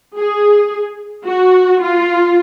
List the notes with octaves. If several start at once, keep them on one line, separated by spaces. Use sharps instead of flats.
G#4
F#4
F4